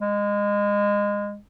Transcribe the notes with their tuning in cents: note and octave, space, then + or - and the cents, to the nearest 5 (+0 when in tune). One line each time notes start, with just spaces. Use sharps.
G#3 -25